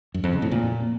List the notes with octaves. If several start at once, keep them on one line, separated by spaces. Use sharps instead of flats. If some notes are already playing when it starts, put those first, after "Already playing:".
F#2
F2
C#3
A2
A#2